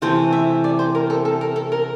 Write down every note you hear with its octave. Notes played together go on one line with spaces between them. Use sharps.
C3 E3 A3 C4 C5
E5
D5
C5
A#4
A4
A4
A#4
A4
A#4